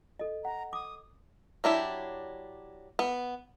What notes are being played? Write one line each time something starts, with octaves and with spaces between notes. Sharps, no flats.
A4 D#5
F#5 A#5
D6 D#6
F#3 D4 E4 G4
B3